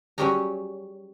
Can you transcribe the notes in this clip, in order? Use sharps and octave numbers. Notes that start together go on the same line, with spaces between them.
F#3 G3 C#4 G4 G#4 A#5